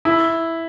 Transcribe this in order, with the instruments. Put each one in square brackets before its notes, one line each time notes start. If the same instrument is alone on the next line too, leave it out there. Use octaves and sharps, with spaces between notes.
[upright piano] E4